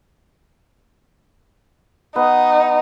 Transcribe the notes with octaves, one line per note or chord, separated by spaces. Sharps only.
B3 D#4